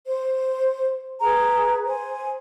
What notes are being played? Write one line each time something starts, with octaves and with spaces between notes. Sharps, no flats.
C5
G#4 B4 A#5
C5 G#5